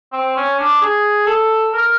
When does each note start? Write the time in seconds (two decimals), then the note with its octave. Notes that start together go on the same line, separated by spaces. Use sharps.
0.13 C4
0.37 C#4
0.59 D4
0.81 G#4
1.26 A4
1.73 A#4